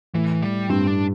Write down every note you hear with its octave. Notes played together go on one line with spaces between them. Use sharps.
A2 E3
G3
G2 C4
D4